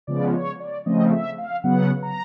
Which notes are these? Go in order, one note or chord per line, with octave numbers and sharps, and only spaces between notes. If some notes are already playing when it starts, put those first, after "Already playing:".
C#3 F3 G#3 B3 D5
C#5
D5
C#3 F3 A3 C4 D#5
E5
F5
C#3 F#3 B3 F#5
A#5